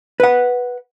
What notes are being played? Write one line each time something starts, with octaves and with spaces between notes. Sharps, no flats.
B4 F#5